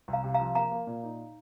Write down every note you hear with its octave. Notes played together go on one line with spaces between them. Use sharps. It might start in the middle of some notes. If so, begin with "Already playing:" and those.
C2
F5 A#5
C3
F3 F5 A#5
A#3 F5 A#5
A#3
A#2
D#4